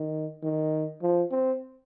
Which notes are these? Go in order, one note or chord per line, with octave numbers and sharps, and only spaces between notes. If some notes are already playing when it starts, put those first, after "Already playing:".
Already playing: D#3
D#3
F3
C4